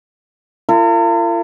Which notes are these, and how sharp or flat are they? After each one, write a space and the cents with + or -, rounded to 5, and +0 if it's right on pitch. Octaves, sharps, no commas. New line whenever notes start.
F4 -45 A#4 -45